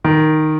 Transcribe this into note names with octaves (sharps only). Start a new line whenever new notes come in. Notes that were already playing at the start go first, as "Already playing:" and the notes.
D#3